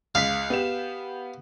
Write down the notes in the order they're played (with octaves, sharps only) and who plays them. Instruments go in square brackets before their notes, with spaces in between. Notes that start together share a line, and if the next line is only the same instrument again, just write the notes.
[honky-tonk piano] C#2 B6 [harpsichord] F5
[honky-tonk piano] B3 G4 E7